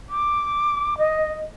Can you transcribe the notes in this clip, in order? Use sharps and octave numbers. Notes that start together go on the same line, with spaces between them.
D6
D#5